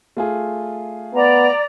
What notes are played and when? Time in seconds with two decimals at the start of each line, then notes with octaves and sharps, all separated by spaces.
0.17 A3 F4 G#4
1.14 B3 D5 A#5